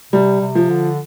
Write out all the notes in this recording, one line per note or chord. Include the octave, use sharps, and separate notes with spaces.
C3 G3
C3
F3
D3